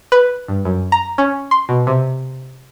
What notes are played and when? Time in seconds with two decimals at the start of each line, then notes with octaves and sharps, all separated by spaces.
0.12 B4
0.48 G2
0.65 F#2
0.92 A#5
1.18 C#4
1.51 C6
1.69 B2
1.87 C3